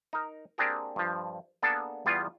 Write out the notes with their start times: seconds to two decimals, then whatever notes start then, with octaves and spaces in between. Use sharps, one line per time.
0.13 D#4 A#4
0.58 A#3 C4 D4 G4 G#4 A#4
0.96 G2 F3
1.62 A#3 B3 D4 G#4 A4
2.06 E2 G3 B3 F4 G#4